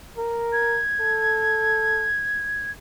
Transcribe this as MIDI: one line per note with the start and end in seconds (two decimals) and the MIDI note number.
0.18 0.80 70
0.53 2.71 92
1.00 2.09 69